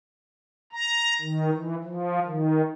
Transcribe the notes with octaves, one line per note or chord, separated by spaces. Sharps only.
A#5
D#3
E3
F3
D#3